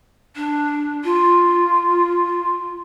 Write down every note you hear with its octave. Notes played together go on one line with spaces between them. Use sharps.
D4
F4